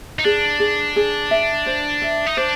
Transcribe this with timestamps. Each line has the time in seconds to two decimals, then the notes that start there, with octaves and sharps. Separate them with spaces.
0.19 D#4
0.24 D4 G#4
0.60 G#4
0.96 G#4
1.31 E5
1.66 C5
2.02 E5
2.27 D#4
2.37 D4 C5